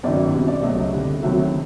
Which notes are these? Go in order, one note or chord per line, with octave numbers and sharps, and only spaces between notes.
G1 F#2 D#3 D5
C2 B2 G3
D5
C#2 B2 F#3 A3 D#5
F2 D3 G3
C2 C3 D#3 F#3 A3 E5